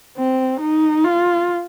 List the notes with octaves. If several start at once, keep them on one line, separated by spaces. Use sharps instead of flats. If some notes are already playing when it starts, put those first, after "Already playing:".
C4
D#4
F4